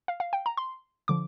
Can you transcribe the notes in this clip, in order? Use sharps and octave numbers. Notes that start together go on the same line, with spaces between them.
F5
F5
G5
A#5
C6
D3 F3 D6